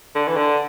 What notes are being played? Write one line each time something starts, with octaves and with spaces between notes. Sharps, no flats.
D3
E3
D3